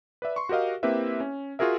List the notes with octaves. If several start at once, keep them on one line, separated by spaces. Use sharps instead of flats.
B4 D5 E5
C6 C#6
F#4 G4 A#4 D#5 F5
A#3 C4 E4 G4 B4 E5
C#4
F4 F#4 G#4 A#4 E5